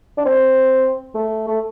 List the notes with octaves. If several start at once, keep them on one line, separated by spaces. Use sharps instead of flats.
D4
C4
A3
A3